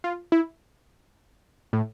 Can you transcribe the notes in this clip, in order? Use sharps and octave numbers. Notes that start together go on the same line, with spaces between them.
F4
E4
A2